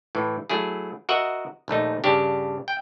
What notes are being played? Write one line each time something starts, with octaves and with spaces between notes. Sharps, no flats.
A2 E3
F#3 A3 E4 G#4
F#4 A#4 D#5 E5 F#5
A#1 D#2 A3 D#4
G2 C#3 D4 G4
G5